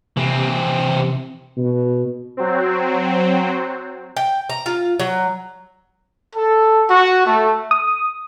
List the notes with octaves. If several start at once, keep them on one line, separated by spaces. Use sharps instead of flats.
C3 E3 C4
B2
F#3 C4
G5
A#5
F4
F#3
A4
F#4
A3
D#6